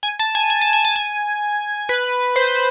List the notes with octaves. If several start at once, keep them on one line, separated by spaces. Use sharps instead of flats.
G#5
A5
G#5
G#5
A5
G#5
A5
G#5
B4
C5